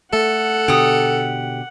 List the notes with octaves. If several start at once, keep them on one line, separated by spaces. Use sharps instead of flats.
A3 A4 F#5
B2 D3 G4 D#6